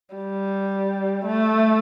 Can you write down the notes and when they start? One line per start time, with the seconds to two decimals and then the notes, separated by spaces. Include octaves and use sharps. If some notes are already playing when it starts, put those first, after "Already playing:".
0.16 G3
1.25 A3